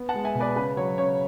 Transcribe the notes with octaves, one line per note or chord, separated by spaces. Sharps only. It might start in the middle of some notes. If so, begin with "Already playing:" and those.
Already playing: B3
F#5 A5
G#3
E5 G#5
B2
B4 D5
C#3 B4
F#3 C#5
C#3 C#5